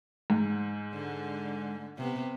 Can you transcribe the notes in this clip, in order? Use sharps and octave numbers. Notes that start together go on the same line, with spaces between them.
G#2
D3
C3 B3